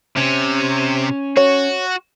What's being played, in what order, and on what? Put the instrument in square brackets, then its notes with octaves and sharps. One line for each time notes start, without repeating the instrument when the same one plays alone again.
[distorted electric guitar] C3 [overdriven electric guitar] C#4
[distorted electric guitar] F#4 [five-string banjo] C#5